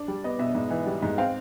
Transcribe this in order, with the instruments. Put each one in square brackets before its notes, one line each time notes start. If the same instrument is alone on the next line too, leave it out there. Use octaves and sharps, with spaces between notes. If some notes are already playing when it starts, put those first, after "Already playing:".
Already playing: [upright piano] D4 D5
G3
B3 D#5
B2 E5
G#2
E3
G3
G#2
C4 F5